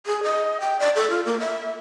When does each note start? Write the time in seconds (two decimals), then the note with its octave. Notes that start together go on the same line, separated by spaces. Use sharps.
0.06 G#4
0.23 D#5
0.60 G5
0.80 D5
0.95 A4
1.10 F4
1.26 A#3
1.40 E5